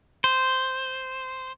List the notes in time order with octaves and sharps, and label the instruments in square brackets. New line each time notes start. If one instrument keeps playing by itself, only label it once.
[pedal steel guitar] C5